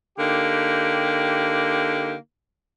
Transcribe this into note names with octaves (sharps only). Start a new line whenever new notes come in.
D3 A#3 D#4 G4